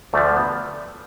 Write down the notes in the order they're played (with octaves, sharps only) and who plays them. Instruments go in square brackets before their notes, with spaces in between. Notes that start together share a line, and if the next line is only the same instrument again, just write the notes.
[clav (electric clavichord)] D2 D3 F3 A3
B3